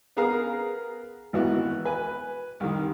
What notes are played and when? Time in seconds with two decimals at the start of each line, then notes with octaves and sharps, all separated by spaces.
0.17 B3 G#4 A#4 F5 A#5
1.33 G#1 E3 B3 F#4
1.85 B4 G#5
2.60 C2 D#3